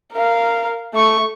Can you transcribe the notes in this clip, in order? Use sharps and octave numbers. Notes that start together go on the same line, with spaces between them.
A#4 F5
A3 C#6